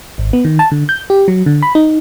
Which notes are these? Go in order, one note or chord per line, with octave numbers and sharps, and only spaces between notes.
G#1
B3
D#3
A5
D3
G6
G4
F#3
D3
B5
D#4